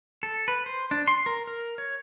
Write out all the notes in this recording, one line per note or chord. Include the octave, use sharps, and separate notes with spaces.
A4
B4
C5
D4
C6
A#4
A#4
C#5